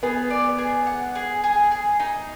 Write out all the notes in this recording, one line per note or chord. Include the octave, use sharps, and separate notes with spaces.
B3 G#4
D5
G#4
F#5
G#4
G#4
G#4
D#4